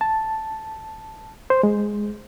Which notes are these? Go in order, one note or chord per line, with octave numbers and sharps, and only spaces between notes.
A5
C5
G#3